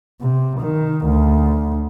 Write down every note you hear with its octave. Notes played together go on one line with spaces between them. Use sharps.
C3
D#3
D2